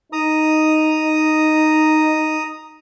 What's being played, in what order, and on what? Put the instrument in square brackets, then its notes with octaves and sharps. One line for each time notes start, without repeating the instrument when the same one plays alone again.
[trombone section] D#4 [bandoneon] A#5 D#6